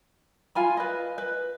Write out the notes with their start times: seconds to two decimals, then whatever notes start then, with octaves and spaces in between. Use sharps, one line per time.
0.55 F4 G#5 B5
0.77 B4 D#5
1.18 B4